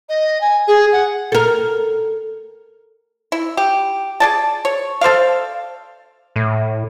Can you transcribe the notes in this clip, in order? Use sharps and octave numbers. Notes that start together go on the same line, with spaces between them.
D#5
G#5
G#4
F#5
A4 A#4
E4
G4
G#4 D5 A5
C#5
A4 C5 D5 F5
A2